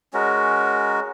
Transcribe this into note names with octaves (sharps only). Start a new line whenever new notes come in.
G#3 C#4 F#4 A#4